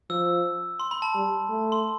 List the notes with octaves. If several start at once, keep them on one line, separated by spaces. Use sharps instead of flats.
F3 E6
C6
B5
A5
G3
A3
C6